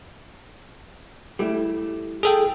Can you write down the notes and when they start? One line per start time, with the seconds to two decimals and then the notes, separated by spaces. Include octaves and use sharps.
1.39 G3 A3 E4
2.23 G#4 A4 G5